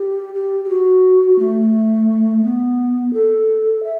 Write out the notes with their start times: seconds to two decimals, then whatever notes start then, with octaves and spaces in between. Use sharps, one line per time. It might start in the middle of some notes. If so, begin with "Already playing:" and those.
Already playing: G4
0.34 G4
0.64 G4
0.69 F#4
1.39 A3
2.44 B3
3.13 A4
3.83 E5